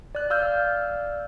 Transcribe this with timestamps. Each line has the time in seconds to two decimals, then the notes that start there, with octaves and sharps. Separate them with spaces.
0.15 D5 F#6
0.30 D5 F5 E6 F6 G6